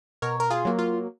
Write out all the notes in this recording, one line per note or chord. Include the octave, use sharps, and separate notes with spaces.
B2 A#4 C#5
A#4
F4 G#4
F#3 A#3
F4